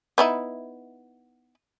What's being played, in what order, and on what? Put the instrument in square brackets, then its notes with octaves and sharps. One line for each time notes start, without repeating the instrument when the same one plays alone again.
[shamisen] B3 D#4 E4